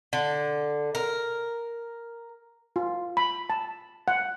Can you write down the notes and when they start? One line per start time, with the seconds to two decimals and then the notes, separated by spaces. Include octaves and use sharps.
0.13 D3
0.95 A#4
2.76 F4
3.17 B5
3.50 A5
4.08 F#5